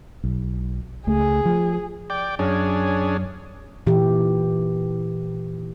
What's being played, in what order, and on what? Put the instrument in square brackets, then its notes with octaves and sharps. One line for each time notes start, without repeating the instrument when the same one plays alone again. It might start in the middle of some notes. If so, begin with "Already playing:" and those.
[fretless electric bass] B1
[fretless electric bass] C#2 A3 [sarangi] G#4
[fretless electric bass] F3
[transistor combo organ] D5 G5
[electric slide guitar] F#2 [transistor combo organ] C#4 D4 G#4
[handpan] A#2 E3 G4